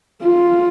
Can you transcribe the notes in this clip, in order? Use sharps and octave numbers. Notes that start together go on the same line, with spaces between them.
F4